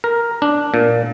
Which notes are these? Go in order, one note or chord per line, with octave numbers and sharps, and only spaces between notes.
A#4
D4
A#2